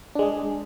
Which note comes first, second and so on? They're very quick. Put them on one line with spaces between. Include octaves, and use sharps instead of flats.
D4 G#3 G#4